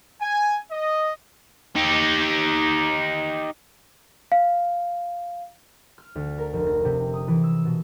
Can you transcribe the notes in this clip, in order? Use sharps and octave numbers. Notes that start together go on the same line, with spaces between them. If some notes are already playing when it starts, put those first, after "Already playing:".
G#5
D#5
D#4 G4
F5
F6
D2
A#4
F1
A#6
C3
D#6
E3
E6
B2